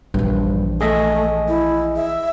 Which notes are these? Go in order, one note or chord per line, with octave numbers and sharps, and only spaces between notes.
A#1 G2 E3
A3 G#4 D#5 E5
E4
E5